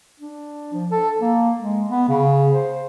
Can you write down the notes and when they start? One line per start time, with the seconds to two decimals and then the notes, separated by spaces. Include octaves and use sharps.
0.20 D4
0.73 F3
0.91 A4
1.21 A#3
1.60 G#3
1.88 B3
2.09 C#3
2.52 C5